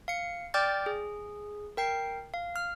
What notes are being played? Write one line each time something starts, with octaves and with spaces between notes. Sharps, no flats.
F5 C#7
D5 G5 D6 F6 G6 A6
G#4
A#4 G5 C7
F5
F6